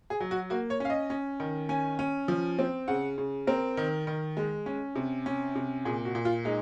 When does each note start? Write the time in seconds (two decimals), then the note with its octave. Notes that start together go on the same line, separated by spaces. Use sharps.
0.10 G#4
0.20 F#3
0.31 F#4
0.50 A#3 F#4
0.70 C#5
0.80 C#4 F5
0.90 D#5
1.10 C#4
1.40 D#3
1.69 C#4 G#5
1.99 C#4
2.28 F3
2.59 C4
2.88 C#3 F#5
3.18 C#3
3.47 C4 A#4
3.77 D#3
4.07 D#3
4.37 G#3
4.66 C#4
4.96 C3
5.26 C#4
5.55 C3
5.85 A#2 G#4
6.05 F#4
6.15 A#2
6.25 F4
6.45 G#3 D#4